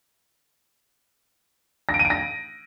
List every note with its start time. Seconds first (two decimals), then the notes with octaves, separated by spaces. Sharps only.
1.89 A#6
1.94 D7
1.99 D#7
2.05 D7
2.10 A#6